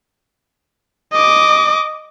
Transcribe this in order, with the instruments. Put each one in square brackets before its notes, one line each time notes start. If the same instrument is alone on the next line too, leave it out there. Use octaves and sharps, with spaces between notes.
[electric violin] D#5 D6